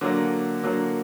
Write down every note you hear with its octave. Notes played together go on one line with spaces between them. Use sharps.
D3 F#3 A#3
D3 F#3 A#3